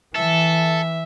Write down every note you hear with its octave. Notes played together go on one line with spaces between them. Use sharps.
E3 A4 E5